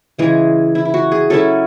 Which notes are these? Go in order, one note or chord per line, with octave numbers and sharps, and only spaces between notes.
C#3 E3 G#3 G#4
E4
E4
F#4
G#4
F#3 C#4 E4 A4